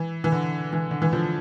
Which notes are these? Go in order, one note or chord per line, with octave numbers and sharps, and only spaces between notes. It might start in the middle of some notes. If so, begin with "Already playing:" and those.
Already playing: E3
E3
D3
E3
D3
E3
D3 F3